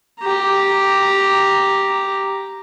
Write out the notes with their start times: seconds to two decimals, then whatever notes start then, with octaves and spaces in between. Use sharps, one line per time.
0.20 G4 A#5